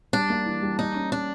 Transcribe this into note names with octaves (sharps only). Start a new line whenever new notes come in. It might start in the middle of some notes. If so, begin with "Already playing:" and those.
G3 D4
A#3
E3
G3
A#3 D#4
C#4
C#4 D4